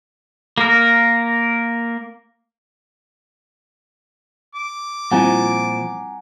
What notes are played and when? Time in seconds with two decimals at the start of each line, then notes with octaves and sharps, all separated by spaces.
0.58 A#3 A#4
4.55 D6
5.11 A#2 F3 G3 C4 E4 F#5 G#5 A#5